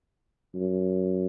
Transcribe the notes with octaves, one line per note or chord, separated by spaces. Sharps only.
F#2